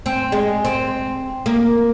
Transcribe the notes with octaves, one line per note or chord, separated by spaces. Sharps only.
C4
G#3
C4
A#3